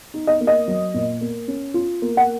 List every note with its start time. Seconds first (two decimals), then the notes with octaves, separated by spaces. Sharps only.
0.14 D#4
0.27 D#5
0.41 A#3
0.47 D#5
0.68 F#3
0.94 A#2
1.21 A#3
1.48 C#4
1.74 F4
2.02 A#3
2.17 F#5